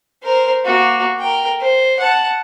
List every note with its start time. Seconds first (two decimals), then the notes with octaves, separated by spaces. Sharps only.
0.22 A#4 C5
0.64 A#3 F#4
1.19 A#4 G5
1.60 C5
1.99 F#5 A5